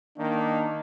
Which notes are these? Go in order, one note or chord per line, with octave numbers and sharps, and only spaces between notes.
D#3 A#3 D4